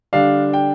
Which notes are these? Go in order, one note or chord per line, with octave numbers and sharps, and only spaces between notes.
D3 G3 D4 F5
G5